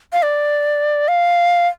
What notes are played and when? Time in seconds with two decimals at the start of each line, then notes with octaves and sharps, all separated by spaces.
0.13 F5
0.23 D5
1.08 F5